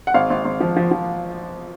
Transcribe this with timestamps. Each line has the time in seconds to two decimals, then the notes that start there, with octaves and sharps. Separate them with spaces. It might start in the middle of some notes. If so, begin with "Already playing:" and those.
0.07 F#5
0.14 G#1 F5
0.30 G#1
0.45 G#1
0.60 F3
0.77 F3
0.91 F3